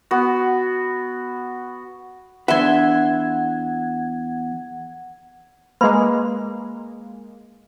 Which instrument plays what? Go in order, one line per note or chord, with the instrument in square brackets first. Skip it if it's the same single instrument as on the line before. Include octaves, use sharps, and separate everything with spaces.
[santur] B3 F#4
[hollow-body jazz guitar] E2 D4 B4 [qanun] E5 C6 [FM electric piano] F#5 G#6
[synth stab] G#3 A#3 [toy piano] B4 B5 C6